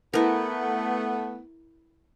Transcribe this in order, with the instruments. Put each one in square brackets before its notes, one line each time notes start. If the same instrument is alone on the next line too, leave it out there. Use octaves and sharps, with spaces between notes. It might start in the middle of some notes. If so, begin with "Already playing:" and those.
[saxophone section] A3 B3 [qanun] E4 A#4